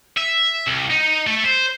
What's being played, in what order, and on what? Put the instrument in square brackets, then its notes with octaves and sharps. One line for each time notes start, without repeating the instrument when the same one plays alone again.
[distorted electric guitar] E5
C2
D#4
A3
C5